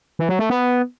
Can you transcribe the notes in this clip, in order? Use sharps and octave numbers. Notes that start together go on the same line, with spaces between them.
E3
F#3
A3
B3